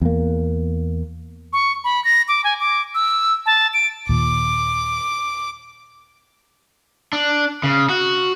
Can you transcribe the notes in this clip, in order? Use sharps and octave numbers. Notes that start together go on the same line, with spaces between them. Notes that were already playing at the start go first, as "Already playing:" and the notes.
E2 A#3
C#6
B5
A#6
D6
G#5
D6
E6
A5
D7
D#2 A#2 D6
D4
C#3
F#4